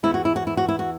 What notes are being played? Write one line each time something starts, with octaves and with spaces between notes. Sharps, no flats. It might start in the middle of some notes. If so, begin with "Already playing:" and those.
E2 E3 E4
F#4
E4
F#4
E4
F#4
E4
F#4